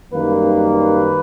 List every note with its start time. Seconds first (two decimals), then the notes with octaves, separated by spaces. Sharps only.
0.11 F#2 D#3 G3 A#3 B4
0.44 B4
0.76 B4